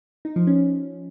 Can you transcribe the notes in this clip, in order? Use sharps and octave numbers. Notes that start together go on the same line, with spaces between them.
D#4
F3
C#4